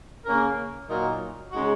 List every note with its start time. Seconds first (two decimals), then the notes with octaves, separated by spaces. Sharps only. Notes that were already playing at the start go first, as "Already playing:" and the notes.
0.25 C#3 A#3 C#4 A#4
0.88 A#2 F#3 D#4 A#4
1.51 C#3 G#3 D#4 F#4